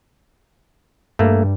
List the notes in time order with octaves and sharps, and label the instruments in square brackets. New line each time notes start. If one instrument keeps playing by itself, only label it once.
[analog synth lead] G2 [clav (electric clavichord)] A3 A#3